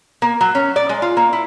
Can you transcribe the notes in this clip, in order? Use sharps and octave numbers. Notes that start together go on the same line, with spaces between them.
A#3
F#3
C#4
D5
G#3
F4
A#3
E4